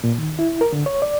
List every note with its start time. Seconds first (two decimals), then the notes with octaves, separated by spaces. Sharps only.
0.04 A#2
0.18 D#3
0.39 E4
0.61 A#4
0.73 D3
0.86 C#5
1.02 D5